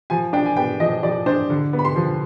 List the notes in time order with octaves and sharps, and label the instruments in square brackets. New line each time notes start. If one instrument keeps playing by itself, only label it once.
[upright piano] F3 G#5
D4 G5
G#5
B3 G5
F3 D#5
F3 D5
D4 C5
D3
B3
B5
C6
F3